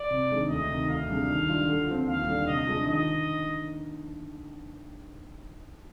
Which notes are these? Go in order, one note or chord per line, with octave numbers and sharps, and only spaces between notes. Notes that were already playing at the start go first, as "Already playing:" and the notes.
Already playing: D5
C3
D#3 G#3 D4
D2 D#5
C3 D#3
D2 F5
C3 G3 D4 G#4
D#3
G3 D4 F4
D3
F3 C4
D#2 F5
D3 G3 A#3 D4
C3 D#5
F3 G#3 D4
D#3 D#5